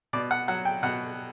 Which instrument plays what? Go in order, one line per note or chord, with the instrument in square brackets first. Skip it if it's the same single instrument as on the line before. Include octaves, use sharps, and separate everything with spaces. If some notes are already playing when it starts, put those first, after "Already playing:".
[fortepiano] B2 D5
F#5
F#3 F#5
G5
B2 F#5